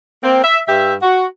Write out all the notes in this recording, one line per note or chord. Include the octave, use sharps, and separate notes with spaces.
A#3 C4
E5
G2 G4 E5
F#4